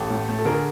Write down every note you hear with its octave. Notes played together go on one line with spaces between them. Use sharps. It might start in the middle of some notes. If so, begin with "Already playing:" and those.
Already playing: A1 G4 A4
A2
A3
A4
D3 G#4 A#4